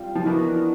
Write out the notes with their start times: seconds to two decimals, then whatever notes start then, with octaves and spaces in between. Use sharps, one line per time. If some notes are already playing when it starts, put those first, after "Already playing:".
Already playing: G3 C4 F4
0.15 F3
0.26 E3 B3 D4 F#4 A#4 D#5